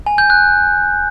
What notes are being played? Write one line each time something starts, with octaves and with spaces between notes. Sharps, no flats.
G#5
G6
F#6